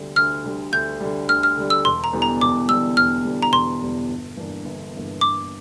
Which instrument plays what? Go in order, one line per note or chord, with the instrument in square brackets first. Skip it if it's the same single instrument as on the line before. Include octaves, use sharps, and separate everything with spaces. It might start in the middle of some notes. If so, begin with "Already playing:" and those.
Already playing: [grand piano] D2 D3 G3
[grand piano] D2 [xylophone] F6
[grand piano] D3 G3
[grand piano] D2 [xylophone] G6
[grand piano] D3 G3
[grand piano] D2 [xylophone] F6
[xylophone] F6
[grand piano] D3 G3
[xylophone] E6
[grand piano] E1 [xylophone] C6
[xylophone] A#5
[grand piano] E2 D3 G3
[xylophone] A#5
[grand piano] E1 [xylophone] D6
[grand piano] E2 D3 G3 [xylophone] E6
[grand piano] E1 [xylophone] F6
[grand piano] E2 D3 G3
[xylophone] A#5
[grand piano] E1 [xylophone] C6
[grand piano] E2 D3 G3
G1
G2 E3 A#3 D4
G1
G2 E3 A#3 D4
[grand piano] G1 [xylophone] D6